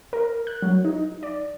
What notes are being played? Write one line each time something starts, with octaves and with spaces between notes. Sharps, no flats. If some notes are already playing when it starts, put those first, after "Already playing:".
A#4
F#6
F#3
D#4
D5